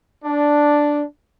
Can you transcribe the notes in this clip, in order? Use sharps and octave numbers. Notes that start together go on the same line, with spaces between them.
D4